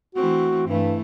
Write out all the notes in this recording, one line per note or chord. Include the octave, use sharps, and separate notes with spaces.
E3 A3 C4 F#4
G2 E3 A3